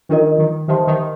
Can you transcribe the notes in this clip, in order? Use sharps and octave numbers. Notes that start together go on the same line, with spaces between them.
D#3 D4 F4 A#4 D#5
D#3
D#3 G4 C5 E5 A5 C6
D#3